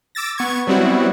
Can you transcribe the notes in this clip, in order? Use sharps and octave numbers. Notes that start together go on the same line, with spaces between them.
D6 E6 A6 A#6
B3 C#6 G#6
F#3 G3 B3 C4 E4 F#4